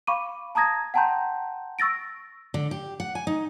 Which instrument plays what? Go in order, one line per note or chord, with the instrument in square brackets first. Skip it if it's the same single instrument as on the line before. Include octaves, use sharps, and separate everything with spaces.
[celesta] F5 B5 C#6 D6 D#7
A5 A#5 D#6 G#6 A#6
F#5 G5 A5 A#5 C6 G6
C#6 E6 A6 A#6 D7
[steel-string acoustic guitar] D3
G4
F#5
G#5
D#4